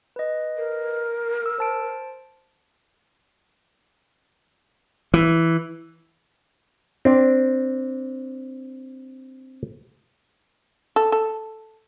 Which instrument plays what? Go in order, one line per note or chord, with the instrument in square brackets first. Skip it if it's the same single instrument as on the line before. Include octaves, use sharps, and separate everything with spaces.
[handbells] B4 D#5
[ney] A#4
[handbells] E6
C5 A5 D7
[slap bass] E3
[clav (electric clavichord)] C4 D4
[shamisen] A4
A4